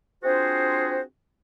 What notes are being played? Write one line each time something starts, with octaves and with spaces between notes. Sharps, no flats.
C4 D4 F4 F#4 G#4 C5